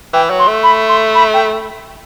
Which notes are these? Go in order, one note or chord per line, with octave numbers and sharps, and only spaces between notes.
E3 G5
F#3
C6
A3
B5
C6
B5
G5